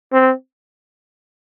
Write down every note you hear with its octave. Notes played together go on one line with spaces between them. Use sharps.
C4